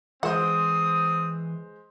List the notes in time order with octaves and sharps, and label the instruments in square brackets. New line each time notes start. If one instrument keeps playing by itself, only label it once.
[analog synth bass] E3 [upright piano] G#3 C5 [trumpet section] C4 D#6 [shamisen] F#5